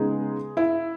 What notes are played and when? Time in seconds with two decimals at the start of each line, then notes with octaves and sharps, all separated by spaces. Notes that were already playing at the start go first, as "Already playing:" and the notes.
Already playing: C#3 G#3 B3 D#4 G#4
0.57 E4